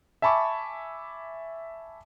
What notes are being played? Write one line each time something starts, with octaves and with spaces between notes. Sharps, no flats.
E5 G#5 A5 B5 C#6 D6